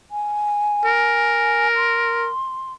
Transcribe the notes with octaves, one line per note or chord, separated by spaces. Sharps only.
G#5
A#4
C6